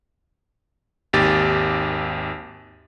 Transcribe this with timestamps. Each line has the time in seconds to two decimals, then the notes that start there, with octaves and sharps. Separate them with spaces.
1.13 G#1 D#2 G4 A6